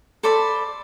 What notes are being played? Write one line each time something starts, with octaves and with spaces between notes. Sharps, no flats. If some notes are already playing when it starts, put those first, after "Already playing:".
A4 C5 D5 B5